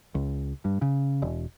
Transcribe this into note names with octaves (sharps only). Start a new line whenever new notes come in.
C#2
G2
C#3
E1